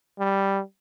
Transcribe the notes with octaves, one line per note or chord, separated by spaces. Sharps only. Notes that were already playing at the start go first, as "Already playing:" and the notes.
G3